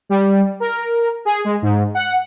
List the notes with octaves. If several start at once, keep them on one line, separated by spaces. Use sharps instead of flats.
G3
A#4
G#4
G#3
G#2
F#5